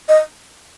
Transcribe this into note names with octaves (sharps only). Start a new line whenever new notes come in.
D#5